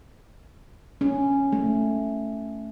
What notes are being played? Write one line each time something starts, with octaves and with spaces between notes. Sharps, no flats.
C#4
A3